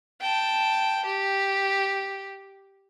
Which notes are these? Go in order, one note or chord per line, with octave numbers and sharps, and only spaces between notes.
G5 A5
G4